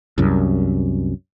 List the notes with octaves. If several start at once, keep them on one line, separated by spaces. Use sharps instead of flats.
C2 F#2